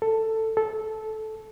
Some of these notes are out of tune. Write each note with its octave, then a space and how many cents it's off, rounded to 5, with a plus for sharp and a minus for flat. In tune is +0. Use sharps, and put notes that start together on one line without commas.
A4 +10
A4 -15